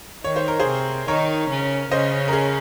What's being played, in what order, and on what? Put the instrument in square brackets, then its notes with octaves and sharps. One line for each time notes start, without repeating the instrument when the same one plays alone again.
[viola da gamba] D#3 D#4 [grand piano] C#5
[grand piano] C5
A#4
G#4 C5
[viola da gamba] C3 C4
[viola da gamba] D#3 D#4 [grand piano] A#4 C#5
[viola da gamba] C#3 C#4
[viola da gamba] C#3 C#4 [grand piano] C5 D#5
[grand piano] A#4
G#4